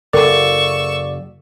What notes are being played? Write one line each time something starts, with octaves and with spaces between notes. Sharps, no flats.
F#1 A4 A#4 D5 C#6 E6